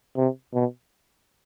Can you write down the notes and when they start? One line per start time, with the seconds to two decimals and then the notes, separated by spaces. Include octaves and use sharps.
0.16 C3
0.54 B2